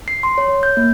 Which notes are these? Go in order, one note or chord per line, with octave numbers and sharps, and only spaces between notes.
C7
C6
C#5
G6
A#3